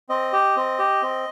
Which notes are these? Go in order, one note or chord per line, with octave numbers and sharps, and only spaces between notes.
C4 D#5
G4
C4
G4
C4